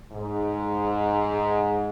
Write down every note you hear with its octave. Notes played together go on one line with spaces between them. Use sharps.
G#2